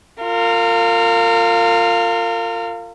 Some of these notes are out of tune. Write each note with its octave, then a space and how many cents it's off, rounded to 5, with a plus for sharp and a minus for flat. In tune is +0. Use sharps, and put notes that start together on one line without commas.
F4 +0 A#4 -40